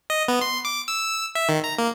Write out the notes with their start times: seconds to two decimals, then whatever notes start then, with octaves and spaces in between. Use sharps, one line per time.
0.10 D#5
0.28 B3
0.41 C6
0.65 D6
0.88 E6
1.35 E5
1.49 D#3
1.64 A#5
1.78 A#3